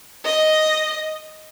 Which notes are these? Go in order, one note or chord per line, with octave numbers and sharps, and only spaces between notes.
D#5